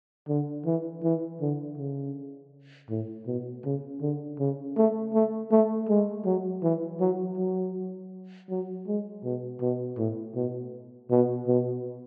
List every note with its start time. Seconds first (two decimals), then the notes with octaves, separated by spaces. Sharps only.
0.29 D3
0.66 E3
1.04 E3
1.41 D3
1.78 C#3
2.90 A2
3.27 B2
3.65 C#3
4.02 D3
4.39 C#3
4.77 A3
5.14 A3
5.51 A3
5.89 G#3
6.26 F#3
6.63 E3
7.00 F#3
7.38 F#3
8.50 F#3
8.87 G#3
9.24 B2
9.61 B2
9.98 A2
10.36 B2
11.11 B2
11.48 B2